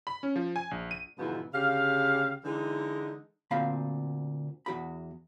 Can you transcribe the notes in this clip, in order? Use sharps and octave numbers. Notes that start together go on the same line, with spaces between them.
B5
C#4
F3
G#5
A#1
D#7
D2 G#2 B2 E3 F3 B3
D2 C#3 G4 F5
D3 E3 G#3 D#4
D2 A#2 C4 F5 B5
E2 F#4 B5